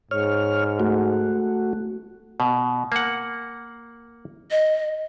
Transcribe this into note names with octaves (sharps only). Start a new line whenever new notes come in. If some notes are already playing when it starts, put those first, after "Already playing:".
G#2 C#5 F6
A3 F#4
B2
A#3 F#5
D#5